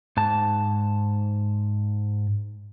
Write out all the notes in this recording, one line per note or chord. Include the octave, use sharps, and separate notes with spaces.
G#2 A5